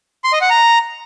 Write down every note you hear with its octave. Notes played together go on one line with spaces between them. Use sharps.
C6
D#5
F#5
A#5